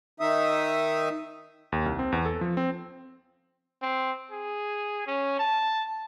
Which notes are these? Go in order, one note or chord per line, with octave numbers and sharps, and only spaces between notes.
D#3 D#4 E5 D#6
D#2
C2
C4
E2
A4
F3
C4
C4
G#4
C#4
A5